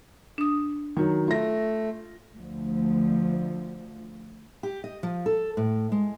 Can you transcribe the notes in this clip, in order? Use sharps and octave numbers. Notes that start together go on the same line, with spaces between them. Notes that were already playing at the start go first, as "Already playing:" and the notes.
D4 D#6
D#3 F#3
A3 F4 A#6
D2 F3
G4
D#5
F3
A4
A2
G#3